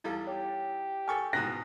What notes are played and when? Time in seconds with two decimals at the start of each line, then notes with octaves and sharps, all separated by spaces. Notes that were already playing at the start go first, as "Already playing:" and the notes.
0.04 E2 G3 D#4 E4 A4 F5
0.27 G4 C#5
1.08 A4 G#5 C#6 F6
1.33 E2 G#2 B2 G5 F#6 A#6